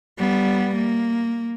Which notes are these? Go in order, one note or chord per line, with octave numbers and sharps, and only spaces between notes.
G3 B3
A#3